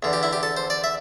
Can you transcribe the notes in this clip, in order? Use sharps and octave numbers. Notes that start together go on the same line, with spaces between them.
E2 D3
G4
E4
G4
A4
C5
D5
E5